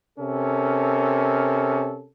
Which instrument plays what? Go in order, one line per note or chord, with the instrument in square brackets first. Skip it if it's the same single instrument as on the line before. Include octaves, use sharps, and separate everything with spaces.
[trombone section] C3 C#4 A4 A#4